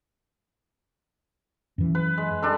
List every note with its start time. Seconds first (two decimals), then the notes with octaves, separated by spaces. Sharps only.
1.78 F#2 E3
1.95 B4
2.18 G#3
2.42 G3 D4 A4